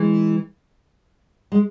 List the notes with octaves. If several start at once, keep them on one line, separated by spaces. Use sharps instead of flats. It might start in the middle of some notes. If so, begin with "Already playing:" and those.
Already playing: E3 G#3
G#3